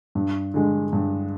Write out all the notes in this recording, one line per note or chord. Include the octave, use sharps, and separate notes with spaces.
G2
D3 G#3
G2